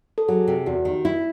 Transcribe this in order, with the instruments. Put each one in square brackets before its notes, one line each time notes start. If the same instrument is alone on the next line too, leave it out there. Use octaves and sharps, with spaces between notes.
[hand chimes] A4
[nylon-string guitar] F#3 [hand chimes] G#4
[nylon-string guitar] C3
[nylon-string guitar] E2 [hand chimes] F#4
[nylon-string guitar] D#3
E4